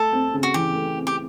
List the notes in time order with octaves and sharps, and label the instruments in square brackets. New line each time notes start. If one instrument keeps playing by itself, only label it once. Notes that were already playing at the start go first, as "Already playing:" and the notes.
Already playing: [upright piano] A3 [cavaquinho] A4
[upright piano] C4
C#3
[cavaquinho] F#4
[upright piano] E3 [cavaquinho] G4
[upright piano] A3
C4
[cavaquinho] G4